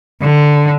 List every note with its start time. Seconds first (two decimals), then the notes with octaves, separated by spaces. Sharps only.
0.22 D3